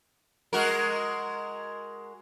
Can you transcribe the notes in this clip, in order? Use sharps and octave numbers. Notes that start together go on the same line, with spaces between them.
G#3 F#4 A#4